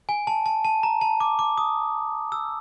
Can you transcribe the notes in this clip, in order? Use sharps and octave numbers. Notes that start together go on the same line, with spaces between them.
G#5
A5
A5
A5
A#5
A5
D6
D6
D#6
E6